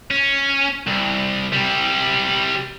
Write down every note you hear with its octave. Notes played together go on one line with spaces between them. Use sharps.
C#4
C2
C3 G3